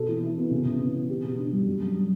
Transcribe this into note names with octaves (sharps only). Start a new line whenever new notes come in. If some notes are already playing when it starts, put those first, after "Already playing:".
Already playing: B2 A4
E3
E4
B3
C#3
C#3
B3
E3
G4
B2
D4
G3
F#2
F#2
G3